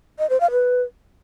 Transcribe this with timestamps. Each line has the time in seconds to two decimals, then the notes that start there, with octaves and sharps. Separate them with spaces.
0.19 D#5
0.30 C5
0.41 F5
0.51 B4